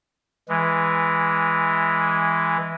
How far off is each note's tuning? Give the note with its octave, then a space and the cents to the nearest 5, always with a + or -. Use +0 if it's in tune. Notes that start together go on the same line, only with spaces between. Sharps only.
E3 +0 G#3 -5